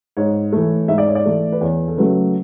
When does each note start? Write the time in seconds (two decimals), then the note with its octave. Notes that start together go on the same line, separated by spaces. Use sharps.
0.17 G#2 C#5
0.53 E3 A3
0.88 G#2 E5
0.98 D5
1.07 C#5
1.15 D5
1.26 E3 A3
1.52 B4
1.61 E2 C#5
1.88 A4
1.97 C#3 F#3 A3 B4